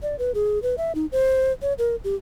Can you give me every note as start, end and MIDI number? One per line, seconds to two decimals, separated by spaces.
0.03 0.16 74
0.19 0.32 71
0.34 0.61 68
0.63 0.75 71
0.78 0.92 76
0.95 1.06 63
1.12 1.52 72
1.62 1.73 73
1.78 1.96 70
2.04 2.16 67